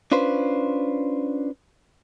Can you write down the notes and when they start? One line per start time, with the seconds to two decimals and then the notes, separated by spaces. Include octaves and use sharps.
0.12 C#4 D4 F4 B4 C5